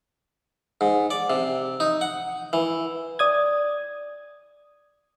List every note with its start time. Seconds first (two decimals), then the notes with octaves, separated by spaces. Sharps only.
0.81 G#2
1.11 D5
1.30 C3
1.80 D#4
2.01 F#5
2.53 E3
3.19 D5 D#6 G#6